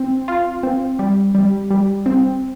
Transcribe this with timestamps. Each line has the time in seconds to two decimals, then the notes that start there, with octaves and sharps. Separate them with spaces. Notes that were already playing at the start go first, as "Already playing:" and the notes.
Already playing: C4
0.28 F4
0.63 C4
0.99 G3
1.35 G3
1.70 G3
2.06 C4